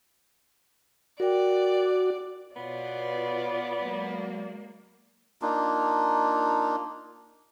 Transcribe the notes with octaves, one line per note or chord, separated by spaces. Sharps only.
F#4 A#4 D5 G5
B2 B3 F4 B4 C#5 D5
F#3 G#3 A#3
A#3 D4 D#4 F4